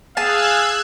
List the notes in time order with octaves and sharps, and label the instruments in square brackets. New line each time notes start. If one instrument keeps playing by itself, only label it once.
[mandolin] G#4 A5 [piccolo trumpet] F5 [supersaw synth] E6 F#6 G#6